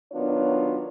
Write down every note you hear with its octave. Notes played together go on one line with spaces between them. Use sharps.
D#3 F#3 B3 D4 F4 C#5